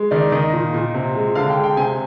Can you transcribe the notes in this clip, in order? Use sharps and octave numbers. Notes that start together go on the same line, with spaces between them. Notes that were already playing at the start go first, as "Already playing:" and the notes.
Already playing: G#3
D#3 D5
D#3 D#5
A#2
A#2
C3
G#3
D3 F5
G5
G#3
G5
C3 G#5